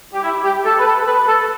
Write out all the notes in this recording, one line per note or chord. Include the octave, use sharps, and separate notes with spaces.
G4
E4
G4
A4
B4
A4
B4
A4